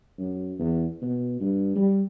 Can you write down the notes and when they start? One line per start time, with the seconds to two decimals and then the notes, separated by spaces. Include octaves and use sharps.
0.18 F#2
0.59 E2
1.02 B2
1.41 G2
1.76 G3